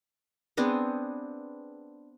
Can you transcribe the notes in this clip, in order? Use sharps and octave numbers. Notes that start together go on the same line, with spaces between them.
B3 C4 D4 G#4